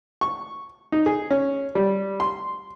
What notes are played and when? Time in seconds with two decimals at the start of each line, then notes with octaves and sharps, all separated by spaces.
0.21 C#6
0.92 D#4
1.06 G#4
1.31 C#4
1.75 G3
2.20 C6